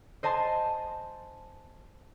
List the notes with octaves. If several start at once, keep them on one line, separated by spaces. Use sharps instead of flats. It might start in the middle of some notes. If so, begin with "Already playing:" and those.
C5 D#5 G#5 A5 C6